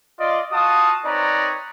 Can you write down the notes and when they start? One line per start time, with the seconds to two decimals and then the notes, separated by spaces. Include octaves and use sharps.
0.19 F4 D5 D#5
0.51 F4 F#4 F5 A5 D#6
1.05 C4 D#4 B4 C#5 D5 A#5